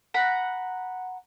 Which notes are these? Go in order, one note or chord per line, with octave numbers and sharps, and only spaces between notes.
F#5 A#5 B5